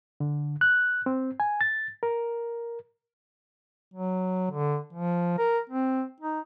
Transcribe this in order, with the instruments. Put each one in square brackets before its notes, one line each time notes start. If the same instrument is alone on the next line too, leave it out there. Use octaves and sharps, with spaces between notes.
[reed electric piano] D3
F#6
C4
G#5
A6
A#4
[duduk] F#3
D3
F3
A#4
C4
D#4